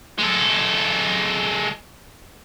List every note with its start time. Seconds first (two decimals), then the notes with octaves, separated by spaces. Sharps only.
0.19 G#3 A4